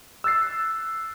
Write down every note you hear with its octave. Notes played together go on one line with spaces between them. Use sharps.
E6 F#6 A6 C7